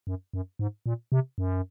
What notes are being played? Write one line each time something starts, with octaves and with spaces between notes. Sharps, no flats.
F#2
F#2
G#2
A#2
C3
F#2